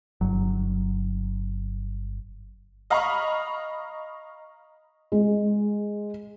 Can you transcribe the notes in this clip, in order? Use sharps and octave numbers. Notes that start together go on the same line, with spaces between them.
G1 F#3
D#5 F5 A#5 B5 C#6
G#3